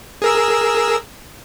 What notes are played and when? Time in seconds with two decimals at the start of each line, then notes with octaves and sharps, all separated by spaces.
0.22 G#4 A#4 E6